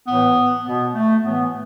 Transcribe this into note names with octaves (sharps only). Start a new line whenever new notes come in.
A2 E3 B3
B2 B3
A3
A2 E3 B3